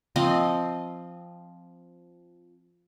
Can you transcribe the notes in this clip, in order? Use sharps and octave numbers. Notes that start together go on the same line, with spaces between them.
F3 C4 D#5